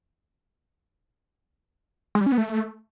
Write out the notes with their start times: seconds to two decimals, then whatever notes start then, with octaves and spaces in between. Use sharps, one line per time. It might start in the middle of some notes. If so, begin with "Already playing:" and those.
2.15 G#3
2.21 G3
2.26 C#4
2.32 B3
2.38 A3